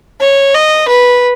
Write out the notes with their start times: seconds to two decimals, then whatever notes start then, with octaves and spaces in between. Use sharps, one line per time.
0.21 C#5
0.55 D#5
0.88 B4